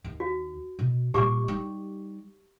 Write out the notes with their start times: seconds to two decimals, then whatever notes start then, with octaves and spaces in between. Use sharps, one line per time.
0.04 D#2
0.20 F#4
0.79 B2
1.14 A#2 G3 G4 C#6 D6
1.48 G3 D#4